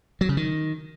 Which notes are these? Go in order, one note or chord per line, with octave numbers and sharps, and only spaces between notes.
F#3
C#3
D#3